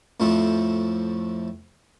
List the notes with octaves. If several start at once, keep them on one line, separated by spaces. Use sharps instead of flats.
F2 A2 F3 A3 C4